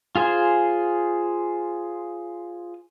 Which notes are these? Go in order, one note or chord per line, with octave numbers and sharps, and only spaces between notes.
F4 G#4 C5 G#5